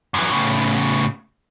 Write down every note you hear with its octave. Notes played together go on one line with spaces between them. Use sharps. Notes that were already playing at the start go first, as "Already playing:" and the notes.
F#2 E3
A2 C#3